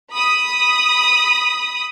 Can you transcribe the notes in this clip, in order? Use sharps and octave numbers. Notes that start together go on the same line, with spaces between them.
B5 D#6